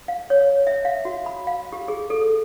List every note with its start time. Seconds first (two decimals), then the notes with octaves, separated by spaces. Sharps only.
0.08 F5
0.30 C#5
0.67 E5
0.85 F5
1.05 F#4
1.26 B5
1.47 F5
1.73 G4
1.88 G#4
2.10 A4
2.22 A4